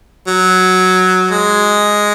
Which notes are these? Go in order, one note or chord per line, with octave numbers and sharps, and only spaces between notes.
F#3
G#3